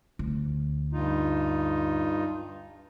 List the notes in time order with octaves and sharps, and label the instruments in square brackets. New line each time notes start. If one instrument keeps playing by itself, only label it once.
[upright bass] D2
[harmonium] G2 D#4 F4